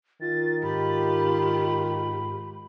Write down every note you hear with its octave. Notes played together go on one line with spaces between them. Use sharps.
D#3 F4 A6
G#2 F4 G4 B5